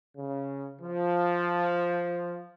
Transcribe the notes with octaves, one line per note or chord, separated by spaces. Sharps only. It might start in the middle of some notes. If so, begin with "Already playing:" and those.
C#3
F3